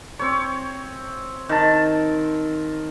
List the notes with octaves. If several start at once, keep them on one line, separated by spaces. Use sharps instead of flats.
C4 C#5
D#3 A5